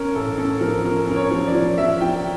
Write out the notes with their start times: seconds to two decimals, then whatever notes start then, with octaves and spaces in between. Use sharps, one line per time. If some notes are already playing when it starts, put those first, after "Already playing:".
Already playing: C#4 A#4
0.15 A1 A4
0.38 C#4 A4
0.61 F3 A#4
0.85 C#4 A#4
1.08 C#4 A#4
1.16 C#5
1.31 F3
1.47 D5
1.55 F3
1.78 F3 E5
2.01 F3 G5